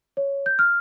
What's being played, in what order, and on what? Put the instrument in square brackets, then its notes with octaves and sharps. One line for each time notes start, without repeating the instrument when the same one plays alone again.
[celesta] C#5
G6
F6